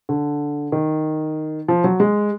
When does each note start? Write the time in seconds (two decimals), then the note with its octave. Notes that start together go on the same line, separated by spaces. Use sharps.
0.09 D3
0.72 D#3
1.68 F3
1.84 F#3
2.00 G#3